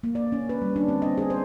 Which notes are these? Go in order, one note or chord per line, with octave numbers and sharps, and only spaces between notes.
A#3
D5
C#4
B4
G3
D4
C4
D#5
G#4
C5